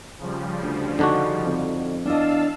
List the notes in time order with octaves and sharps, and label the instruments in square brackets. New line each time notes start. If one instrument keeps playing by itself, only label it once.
[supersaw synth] C#3 F3 G3
[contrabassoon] D2
[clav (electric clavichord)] D3 D4 F#4 [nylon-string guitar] D#4
[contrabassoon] F2
[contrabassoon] E2 [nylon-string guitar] D4 D#5 [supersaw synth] F5 A5 E6